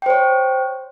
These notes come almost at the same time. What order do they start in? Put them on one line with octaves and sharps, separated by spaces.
G5 C5 C#5